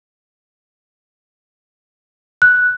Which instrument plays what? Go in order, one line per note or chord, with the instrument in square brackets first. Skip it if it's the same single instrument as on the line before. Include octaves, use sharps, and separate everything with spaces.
[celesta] F#6